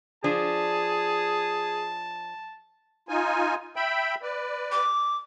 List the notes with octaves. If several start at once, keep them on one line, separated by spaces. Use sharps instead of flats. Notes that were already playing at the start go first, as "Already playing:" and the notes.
F3 D4 G#4 A5
D#4 F4 G#5
E5 G5 B5
B4 D5
D6